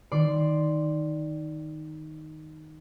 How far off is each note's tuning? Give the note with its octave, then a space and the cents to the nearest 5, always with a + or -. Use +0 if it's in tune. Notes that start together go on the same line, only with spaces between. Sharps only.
D#3 +0 D5 +0 C6 +0